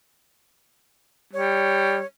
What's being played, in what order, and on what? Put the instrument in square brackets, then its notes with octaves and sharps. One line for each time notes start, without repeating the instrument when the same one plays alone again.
[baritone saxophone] G3 [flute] C#5